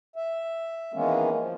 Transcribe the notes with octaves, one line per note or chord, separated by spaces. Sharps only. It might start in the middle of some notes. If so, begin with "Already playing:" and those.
E5
D#3 E3 G#3 A#3 B3 C#4
F3